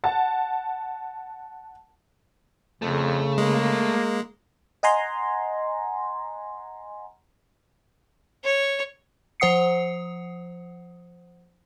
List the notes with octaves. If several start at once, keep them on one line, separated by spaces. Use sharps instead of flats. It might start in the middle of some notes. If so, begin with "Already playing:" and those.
F#5 A5
F2 C#3 A3
G#3 A#3
D#5 F#5 G#5 A#5 C6
C#5
F3 C5 F#5 D#6 C7 C#7